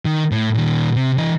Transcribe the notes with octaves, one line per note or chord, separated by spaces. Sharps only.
D#3
A2
A#2 D#3
C3
E3 D#5